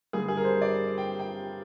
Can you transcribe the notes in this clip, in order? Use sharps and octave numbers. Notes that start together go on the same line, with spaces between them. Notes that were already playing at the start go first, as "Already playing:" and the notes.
G2 D3 G3 G#4
G#4
A#4
C5
D5
G5
G5